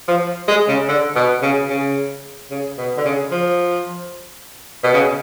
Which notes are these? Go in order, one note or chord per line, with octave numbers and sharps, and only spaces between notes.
F3
G#3
C#3
D3
B2
C#3
C#3
C#3
B2
D3
C#3
F3
B2
C#3